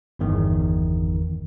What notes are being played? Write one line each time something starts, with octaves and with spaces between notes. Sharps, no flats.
G1 E2 D#3